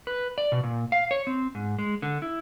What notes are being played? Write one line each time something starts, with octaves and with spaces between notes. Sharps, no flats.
B4
D5
B2
A#2
F5
C#5
C4
G#2
G#3
D3
E4